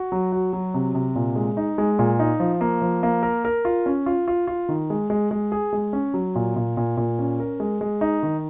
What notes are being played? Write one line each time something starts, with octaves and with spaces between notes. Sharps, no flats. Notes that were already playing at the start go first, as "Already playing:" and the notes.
Already playing: F#4
F#3
F#4
F#3
C3
C3
A#2
G#3
D#4
G#3
A#2
D#4
F3
A#3
F3
A#3
A#4
A#4
F4
C#4
F4
F4
F4
D#3
G#3
G#3
G#3
G#4
G#3
C#4
F#3
A#2
A#2
A#2
A#2
C#4
A#4
G#3
G#3
D#4
D#3